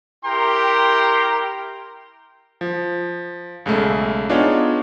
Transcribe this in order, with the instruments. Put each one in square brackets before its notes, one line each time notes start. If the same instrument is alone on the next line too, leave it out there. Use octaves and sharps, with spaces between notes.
[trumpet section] E4 G4 A#4 G5 A#5 C6
[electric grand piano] F3
B1 C#3 G#3 A3
B3 D4 D#4 F4 G#4 C#5